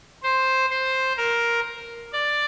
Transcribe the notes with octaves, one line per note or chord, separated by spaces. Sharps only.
C5
C5
A#4
D5